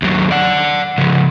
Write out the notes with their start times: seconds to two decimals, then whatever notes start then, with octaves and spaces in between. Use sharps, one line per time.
0.02 D#2 F#3
0.31 D5 F#5
0.98 C#3 F3